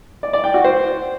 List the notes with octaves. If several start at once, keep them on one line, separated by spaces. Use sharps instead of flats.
D5
D5
G5
F#4
C5